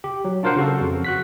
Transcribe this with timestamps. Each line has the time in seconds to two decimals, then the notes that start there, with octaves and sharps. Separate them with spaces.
0.04 G4
0.25 F#3
0.43 D4 F4 A#4 C5 F5 F#5
0.56 C#3 F#4 A4
0.81 F2
1.04 F#4 F#6 B6